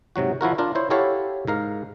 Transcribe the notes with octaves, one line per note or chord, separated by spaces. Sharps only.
G#2 C3 F#3 F#4
F3 E4 F#4 A#4
D4 F4 A#4
E4 C5 C#5
E4 F#4 G4 A4 C#5 F5
G#2 A#4 F5